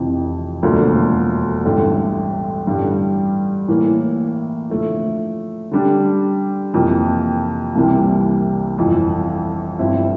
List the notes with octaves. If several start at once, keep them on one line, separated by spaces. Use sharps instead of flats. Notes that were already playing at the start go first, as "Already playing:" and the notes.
Already playing: F1 F2 C3 E3
E1 D2 D3 F3 A#3
A1 G2 D3 A3
A1 G2 D3 G3
A2 E3 A#3
D3 F3 A3 E4
D3 G3 D4
F2 C3 E3 A#3
C2 C3 E3 G3 A#3
G1 F2 E3
G1 G2 F3 C4 E4